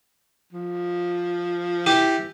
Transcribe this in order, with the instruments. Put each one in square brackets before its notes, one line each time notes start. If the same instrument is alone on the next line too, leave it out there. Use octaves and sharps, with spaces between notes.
[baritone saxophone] F3
[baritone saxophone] E3 [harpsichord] G4